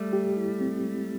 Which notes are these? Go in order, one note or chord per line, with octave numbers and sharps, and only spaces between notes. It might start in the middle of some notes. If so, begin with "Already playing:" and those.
Already playing: G3 A3
G4
E4
C4
G#3